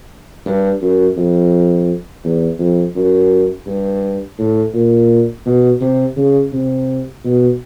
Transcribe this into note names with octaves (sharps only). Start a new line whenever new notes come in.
G2
F#2
F2
E2
F2
F#2
G2
A2
A#2
B2
C3
C#3
C3
B2